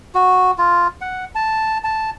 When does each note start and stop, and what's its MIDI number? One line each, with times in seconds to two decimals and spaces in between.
0.15 0.51 66
0.58 0.87 65
1.01 1.25 78
1.35 1.78 81
1.84 2.10 81